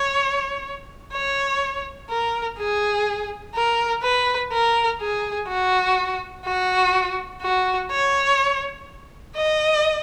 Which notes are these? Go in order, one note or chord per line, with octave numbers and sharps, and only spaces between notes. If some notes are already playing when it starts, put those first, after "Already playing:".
Already playing: C#5
C#5
A#4
G#4
A#4
B4
A#4
G#4
F#4
F#4
F#4
C#5
D#5